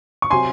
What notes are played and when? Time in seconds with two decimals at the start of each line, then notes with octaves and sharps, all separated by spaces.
0.22 C#6
0.30 C3 F#3 G#5 C6